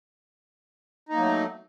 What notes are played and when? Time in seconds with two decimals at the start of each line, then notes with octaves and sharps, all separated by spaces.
1.09 D#4
1.13 A#3
1.17 F#3
1.21 A3